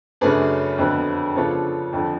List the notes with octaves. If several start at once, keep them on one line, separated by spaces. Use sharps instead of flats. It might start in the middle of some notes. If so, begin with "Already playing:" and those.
F#2 C#3 F#3 A3 D4 G#4 B4
F2 D3 F#3 B3
C#3 F3 B3 D4 F4 A4 C#5
F2 D3 F3